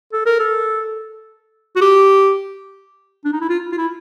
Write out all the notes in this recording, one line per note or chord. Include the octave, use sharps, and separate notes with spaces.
A4
A#4
A4
F#4
G4
D4
D#4
E4
F4
F4
E4